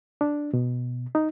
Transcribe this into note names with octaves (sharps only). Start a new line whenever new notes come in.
D4
B2
D#4